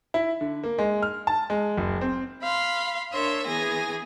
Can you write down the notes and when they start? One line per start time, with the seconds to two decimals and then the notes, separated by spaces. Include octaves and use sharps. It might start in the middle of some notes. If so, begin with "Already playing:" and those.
0.14 E4
0.41 D3
0.63 A#3
0.78 G#3
1.02 F6
1.27 A5
1.50 G#3
1.78 F#1
2.01 C4
2.42 F5 B5 C6
3.11 D4 A#4 C#5 E5 C6
3.46 E3 B3 G#4 G#5 A#6